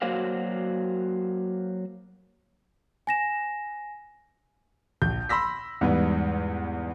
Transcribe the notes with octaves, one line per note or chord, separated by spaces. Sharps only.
F#3 A#3 F#4 C5 D5 F5
G#5 A#6 E7
A#1 G6
B5 C6 E6 A#6 B6
E2 G#2 G3 B4